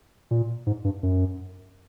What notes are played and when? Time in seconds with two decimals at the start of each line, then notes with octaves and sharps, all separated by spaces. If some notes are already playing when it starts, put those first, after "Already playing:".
0.31 A#2
0.67 G#2
0.84 G2
1.03 F#2